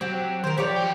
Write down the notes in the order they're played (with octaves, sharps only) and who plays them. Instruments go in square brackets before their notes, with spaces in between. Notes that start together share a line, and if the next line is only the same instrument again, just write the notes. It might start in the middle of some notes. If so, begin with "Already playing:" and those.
[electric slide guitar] F#3 [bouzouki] C4 G4
[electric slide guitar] D#3 [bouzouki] A#4 C5
[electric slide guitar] F3 [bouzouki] G4 C#5 D5
[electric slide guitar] F#3 G5